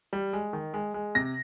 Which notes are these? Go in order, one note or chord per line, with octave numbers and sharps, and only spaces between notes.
G3
G#3
D#3
G#3
G#3
C3 A#6